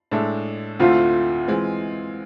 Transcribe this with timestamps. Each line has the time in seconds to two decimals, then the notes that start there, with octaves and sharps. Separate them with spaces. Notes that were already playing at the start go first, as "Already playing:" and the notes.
0.11 A2 G#3 D4 A4 E5
0.79 D2 D3 A3 C4 E4 F4
1.48 E3 G#3 C4